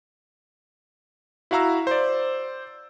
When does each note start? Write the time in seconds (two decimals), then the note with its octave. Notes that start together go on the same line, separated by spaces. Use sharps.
1.51 E4 F#4 F5 A#5 E6
1.87 C5 D5